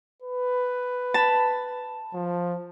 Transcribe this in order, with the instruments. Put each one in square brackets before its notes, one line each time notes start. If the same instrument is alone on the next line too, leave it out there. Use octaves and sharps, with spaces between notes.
[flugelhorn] B4
[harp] A5 B5
[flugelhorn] F3